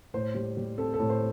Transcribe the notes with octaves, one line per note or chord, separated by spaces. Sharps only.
A2 C5
G3
G3
C4 A4
A4
A2
C5